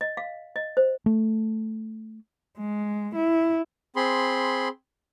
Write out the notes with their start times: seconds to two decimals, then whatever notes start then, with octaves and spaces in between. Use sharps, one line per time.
0.01 D#5
0.17 F5
0.56 D#5
0.77 C5
1.06 A3
2.58 G#3
3.15 E4
3.96 C4 G#4 B5 C6